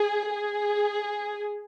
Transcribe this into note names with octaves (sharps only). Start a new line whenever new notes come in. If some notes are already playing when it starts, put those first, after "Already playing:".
Already playing: G#4
G#4